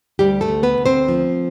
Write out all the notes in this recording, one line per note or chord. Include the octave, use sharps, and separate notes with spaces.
D2 G3 G4
A3 A4
D2
B3 B4
D2
C4 C5
F3